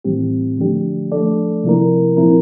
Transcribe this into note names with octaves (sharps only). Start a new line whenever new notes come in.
A2 E3 G3 C4 G4
D3 F3 A3 D4 G4
F3 A3 D4 A4 D5
C3 F3 A#3 E4 A#4
A#2 F3 C4 E4 A#4